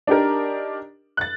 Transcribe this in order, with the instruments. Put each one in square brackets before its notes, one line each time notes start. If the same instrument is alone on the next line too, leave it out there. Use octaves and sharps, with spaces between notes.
[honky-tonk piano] D4 D#4 G4 A#4
F#6 A6